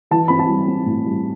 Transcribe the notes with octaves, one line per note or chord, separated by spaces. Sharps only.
E3 A5
C4 B5
A5
G3
C4
A2
G3